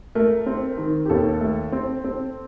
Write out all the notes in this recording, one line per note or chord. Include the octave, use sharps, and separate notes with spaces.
A3 A#4
C4
D#3
G4
D#2 A4
A3
C4
C4